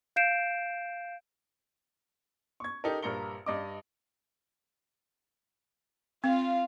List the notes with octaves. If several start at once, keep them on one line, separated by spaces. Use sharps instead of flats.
F5 G6 C7 D7 E7
C#6 G#6
D#4 G4 A4 A#4
A#1 G2 A#4 A#5 C#7 G7
G2 D#5 D6
C4 F4 F5